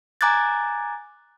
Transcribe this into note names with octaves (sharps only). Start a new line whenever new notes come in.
G#5 A#5 D6 F#6 G#6 A6